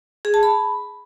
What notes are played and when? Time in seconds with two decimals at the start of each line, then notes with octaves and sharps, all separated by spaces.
0.25 G#4
0.34 A5
0.43 B5